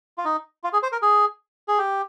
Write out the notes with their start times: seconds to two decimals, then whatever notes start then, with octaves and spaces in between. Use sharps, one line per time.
0.18 F4
0.25 D#4
0.64 F4
0.73 G#4
0.83 C5
0.92 A#4
1.02 G#4
1.68 G#4
1.79 G4